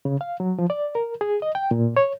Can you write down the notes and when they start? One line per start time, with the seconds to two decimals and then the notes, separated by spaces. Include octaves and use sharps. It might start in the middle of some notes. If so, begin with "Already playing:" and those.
0.05 C#3
0.21 F5
0.40 F#3
0.59 F3
0.70 D5
0.95 A#4
1.21 G#4
1.42 D#5
1.55 G5
1.71 A#2
1.97 C#5